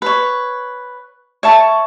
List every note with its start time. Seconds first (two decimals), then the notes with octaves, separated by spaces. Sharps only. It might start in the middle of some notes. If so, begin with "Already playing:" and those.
0.02 B4 C#5
1.43 C#5 E5 A5 C#6